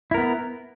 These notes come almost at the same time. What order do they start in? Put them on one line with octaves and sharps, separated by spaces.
E4 A#4 B3